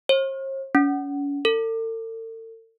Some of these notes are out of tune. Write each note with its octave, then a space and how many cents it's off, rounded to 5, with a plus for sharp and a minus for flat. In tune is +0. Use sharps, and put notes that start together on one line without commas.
C5 +45
C#4 +35
A4 +40